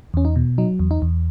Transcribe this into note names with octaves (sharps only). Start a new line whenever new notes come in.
E2 C#4
D#4
B2
F#3 D#4
E2
D#4
E2